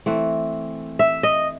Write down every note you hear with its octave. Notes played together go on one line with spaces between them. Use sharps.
E3 A3 C4
E5
D#5